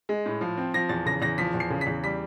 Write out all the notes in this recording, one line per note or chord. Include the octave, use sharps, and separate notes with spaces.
G#3
A2
F3
C4
F3 A#6
E2 A6
C#3 A#6
E2 A#6
F3 B6
E2
C7
C#3
B6
E2
G3 B6